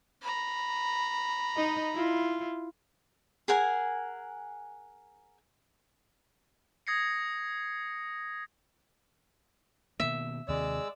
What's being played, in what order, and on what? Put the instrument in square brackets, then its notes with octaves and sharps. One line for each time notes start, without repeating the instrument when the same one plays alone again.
[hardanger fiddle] A#5 B5
[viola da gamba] D#4 D#5
E4 F4
[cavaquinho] G#4 A#4 F#5 G#5
[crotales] D#6 G#6 A#6 C7 C#7
[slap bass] B2 D#3 A#3 [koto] E5
[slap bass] D#2 C3 D#3 [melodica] G#3 E6 [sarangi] D5